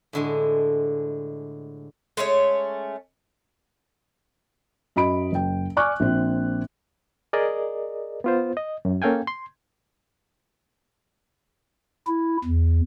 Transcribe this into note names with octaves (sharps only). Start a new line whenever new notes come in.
A2 D3 G#3
G#3 A3 C#4 C#5
F#2 D#5 B5 D7
F#1 G5
D5 G#5 C#6 D6 F6 F#6
A#1 C4
G#4 A#4 D5 D#5
B3 F4 C5
D#5
F#2
A#3 C#4 A4 F5 G5 G#5
C6
E4
E2